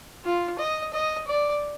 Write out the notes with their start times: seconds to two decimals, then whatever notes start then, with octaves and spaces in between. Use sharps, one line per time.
0.24 F4
0.59 D#5
0.93 D#5
1.27 D5